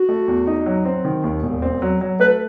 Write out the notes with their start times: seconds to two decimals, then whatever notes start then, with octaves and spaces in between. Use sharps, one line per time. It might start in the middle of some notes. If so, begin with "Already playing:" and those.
Already playing: F#4
0.09 A3
0.28 E2
0.47 D#4
0.66 F#3
0.85 C4
1.05 D#3
1.24 D#2
1.43 E1
1.62 C4
1.82 F#3
2.01 F#3
2.20 A3 B4